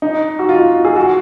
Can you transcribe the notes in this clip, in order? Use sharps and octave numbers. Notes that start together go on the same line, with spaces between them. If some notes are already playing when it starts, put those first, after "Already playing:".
D#4
F#4
F4
G#4
F#4